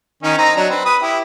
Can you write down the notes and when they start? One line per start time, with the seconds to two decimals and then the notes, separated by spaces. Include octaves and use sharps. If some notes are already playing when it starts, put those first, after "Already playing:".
0.23 D#3 C#4 D#4
0.38 C4 D#4 A#5
0.56 F#3 D4
0.70 C4 B4
0.85 B4 B5 D#6
1.02 E4 G4